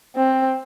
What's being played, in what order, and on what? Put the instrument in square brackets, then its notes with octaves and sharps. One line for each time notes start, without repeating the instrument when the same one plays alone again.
[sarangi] C4